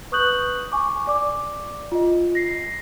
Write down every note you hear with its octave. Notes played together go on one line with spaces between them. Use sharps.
B4 C#6 D#6 F#6 G6 F#7
G#5 C#6 D6
D5 D6
F4 D#5
A#6 C7